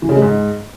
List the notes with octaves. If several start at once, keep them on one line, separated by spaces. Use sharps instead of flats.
E3
C#3
G#3
G#2